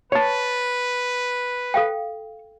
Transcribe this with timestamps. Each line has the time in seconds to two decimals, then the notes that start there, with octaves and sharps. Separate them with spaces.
0.12 B4 C#5 A5
1.74 A4 F5 G5